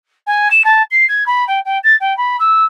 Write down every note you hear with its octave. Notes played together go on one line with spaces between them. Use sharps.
G#5
E7
A5
C7
G#6
B5
G5
G5
A6
G5
B5
E6